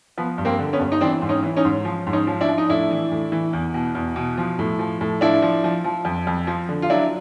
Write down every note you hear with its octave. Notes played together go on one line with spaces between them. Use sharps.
F3 B3
G2
A#3 C4
D3
B3 C#4
G2
D#4
E3 C4 D4
G#2
C#4 D#4
E3
C#4 D#4
G#2
F3
G#2
C#4 D#4
F3
D4 E4
F3
D#4
A2 D4 E4
E3
A2
E3
E2
B2
E2
B2
F3
A2
F3
A2
F3 D4 E4
F3
F3
F3
F2
F2
F3
D3
F4
F#3 D4 E4